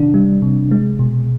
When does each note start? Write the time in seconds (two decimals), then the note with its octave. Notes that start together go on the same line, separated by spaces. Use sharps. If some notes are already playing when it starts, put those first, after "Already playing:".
Already playing: C3 D#3 D4
0.14 G3
0.42 C3
0.71 G#3
0.99 B2